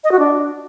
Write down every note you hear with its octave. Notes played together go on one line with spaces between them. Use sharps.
D#5
F#4
D4